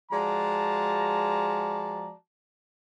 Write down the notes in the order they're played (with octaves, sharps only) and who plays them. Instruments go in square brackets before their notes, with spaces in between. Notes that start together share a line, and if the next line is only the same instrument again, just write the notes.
[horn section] F3 G#3 F#4 D5 A5 A#5